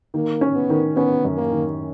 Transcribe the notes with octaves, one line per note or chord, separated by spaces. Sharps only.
D#3 A#3
C#4
B3
D#3
B3 C#4
F#2
A#3
D#3